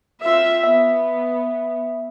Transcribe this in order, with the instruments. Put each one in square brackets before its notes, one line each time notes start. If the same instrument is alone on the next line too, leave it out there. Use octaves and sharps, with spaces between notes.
[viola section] C4 F4 E5
[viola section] B3 [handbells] E5